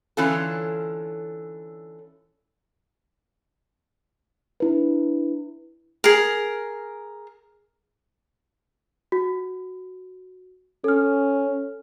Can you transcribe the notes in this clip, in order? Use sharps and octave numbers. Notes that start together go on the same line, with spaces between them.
D3 E3 C#4 F4 A4
D4 E4 B4
G#4 A#4
F#4
C#4 A4 F6